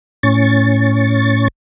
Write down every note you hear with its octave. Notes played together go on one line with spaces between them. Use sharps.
A2 C#4 C#6 A6